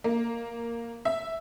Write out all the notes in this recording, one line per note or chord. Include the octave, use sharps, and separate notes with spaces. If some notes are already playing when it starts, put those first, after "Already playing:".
A#3
E5